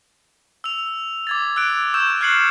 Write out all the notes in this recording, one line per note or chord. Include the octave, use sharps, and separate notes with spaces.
E6 F7
D6 G#6 A6
E6 F#6 D7
C#6 E6 G6 E7
F6 F#6 G#6 C7 C#7 F#7